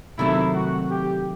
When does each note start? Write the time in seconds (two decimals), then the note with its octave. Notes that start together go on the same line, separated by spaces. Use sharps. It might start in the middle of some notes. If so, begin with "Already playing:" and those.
0.19 C3 D#3 F#3 A3 C4 E4
0.55 F#4
0.90 G4